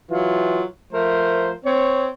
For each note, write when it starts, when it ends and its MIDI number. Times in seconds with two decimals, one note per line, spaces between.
0.11 0.63 52
0.11 0.63 54
0.11 0.63 65
0.92 1.52 53
0.92 1.52 57
0.92 1.52 70
0.92 1.52 72
1.65 2.07 60
1.65 2.07 73